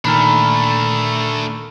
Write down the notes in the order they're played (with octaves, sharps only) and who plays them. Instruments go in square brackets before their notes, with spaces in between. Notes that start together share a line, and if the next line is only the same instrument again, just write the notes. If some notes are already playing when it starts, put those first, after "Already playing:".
[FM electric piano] A#2 D#3 F6 [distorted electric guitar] A3 D4 [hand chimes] G#5 A#5 B5